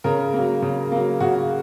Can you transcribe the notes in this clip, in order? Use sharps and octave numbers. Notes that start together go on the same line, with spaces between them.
C#3 A#4
F#3 A#3
C#3
F#3 A#3
C#3 F#4